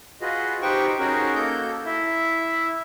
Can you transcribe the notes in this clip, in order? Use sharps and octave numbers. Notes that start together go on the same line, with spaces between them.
F4 F#4 G#4 B4 D#5
D#4 G4 B4 C5 G5 C#6
C#4 D#4 F#4 G#4 A#4
A#3 A4 G6
E4 E5